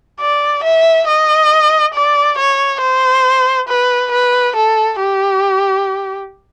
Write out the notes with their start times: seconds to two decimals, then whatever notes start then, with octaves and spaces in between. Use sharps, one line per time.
0.21 D5
0.63 E5
1.08 D#5
1.94 D5
2.38 C#5
2.81 C5
3.68 B4
4.12 B4
4.55 A4
4.99 G4